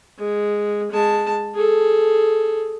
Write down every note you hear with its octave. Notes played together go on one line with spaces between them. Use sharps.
G#3
G#3 A5
G#4 A4